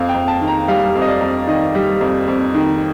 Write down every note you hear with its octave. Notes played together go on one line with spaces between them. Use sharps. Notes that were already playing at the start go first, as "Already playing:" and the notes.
Already playing: F2 F5
G5
F2
A5
D#3
A#5
G3 F5
F2
D#5
D5
F2
D#3 D#5
G3
F2
F2
D#3